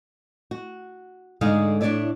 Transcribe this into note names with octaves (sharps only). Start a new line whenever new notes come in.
F#4
G#2 D3 G#3 D#4 G#4 F5
A2 D4 G#4 C#5 D5 E5